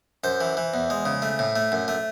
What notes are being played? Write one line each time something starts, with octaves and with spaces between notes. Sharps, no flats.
F#2 C5
E3
E3
E2
G#3
C#3
A3
A2
A3
F#2
A3